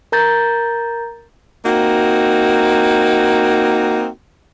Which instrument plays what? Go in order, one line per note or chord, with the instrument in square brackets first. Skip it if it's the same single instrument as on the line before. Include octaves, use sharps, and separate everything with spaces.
[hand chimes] A#4 A#5 G6 A6
[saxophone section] A#3 C4 D#4 F#4